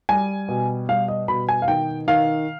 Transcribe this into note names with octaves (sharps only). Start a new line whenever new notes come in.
G3 G#5
B2
G3 F5
D#5
B2 B5
G#5
F5
D#3 G5
D#3 F5